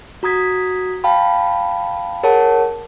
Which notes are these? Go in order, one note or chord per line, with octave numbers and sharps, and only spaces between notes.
F#4 A#5 D#6 G#6 B6
F5 G5 A5 B5
G#4 A#4 C#5 F#5 A5